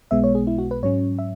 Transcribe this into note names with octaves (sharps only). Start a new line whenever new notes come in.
B1 B2 G#3 B3 E5
C#5
G#4
E4
F#4
B4
G#2 F#3 C#4 C#5
E5